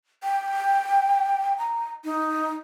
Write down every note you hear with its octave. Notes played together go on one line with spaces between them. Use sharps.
G5
A#5
D#4